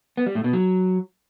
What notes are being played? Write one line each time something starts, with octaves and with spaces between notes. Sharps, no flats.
B3
G3
A2
B2
F#3